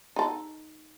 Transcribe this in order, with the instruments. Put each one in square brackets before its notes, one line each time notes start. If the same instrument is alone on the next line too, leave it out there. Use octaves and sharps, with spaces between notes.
[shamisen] D#4 A4